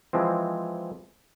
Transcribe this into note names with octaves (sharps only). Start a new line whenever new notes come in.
E3 F3 G#3 C4